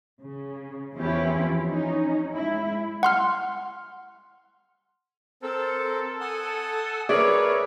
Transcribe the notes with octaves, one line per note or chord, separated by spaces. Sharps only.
C#3
E2 F3 C#4 E4 F4 G4
C#4 D#4
G#3 E4
F#5 C6 F6
C4 A4 A#4 C5
F#5 G#5 D#6
G#4 A#4 B4 C#5 D5 E5